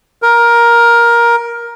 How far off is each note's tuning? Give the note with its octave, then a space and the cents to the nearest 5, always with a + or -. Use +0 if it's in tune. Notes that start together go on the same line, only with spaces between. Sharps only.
A#4 +10